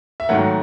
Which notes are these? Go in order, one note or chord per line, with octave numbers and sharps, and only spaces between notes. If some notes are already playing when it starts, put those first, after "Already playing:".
E5
G#2 D#3 F#3 A3 F#5